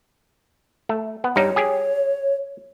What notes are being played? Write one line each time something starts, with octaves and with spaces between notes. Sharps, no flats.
A3
B3
G2 G3 D#4 C#5
G4 G#4 G#5